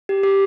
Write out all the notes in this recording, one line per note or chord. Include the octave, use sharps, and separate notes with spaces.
G4
G4